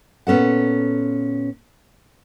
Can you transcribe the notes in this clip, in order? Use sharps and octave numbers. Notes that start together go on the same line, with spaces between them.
A#2 B3 C#4 A4 F#5